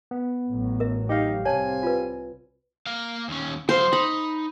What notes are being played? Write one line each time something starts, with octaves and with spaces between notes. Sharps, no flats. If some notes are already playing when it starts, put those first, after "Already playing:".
B3
A1 A2 F#3
A#4 E5
D#4 G4 F5
C2 C4 C#5 G#5 A5
F4 B4
A#3 F5
D#2 C#4
F#3 C5 F5
D#4 B5